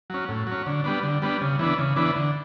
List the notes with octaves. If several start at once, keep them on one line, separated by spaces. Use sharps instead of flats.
F#3 C#4
A2
F#3 C#4
D3
G3 B3 D4
D3
G3 B3 D4
C#3
E3 B3 D4
C#3
E3 B3 D4
D3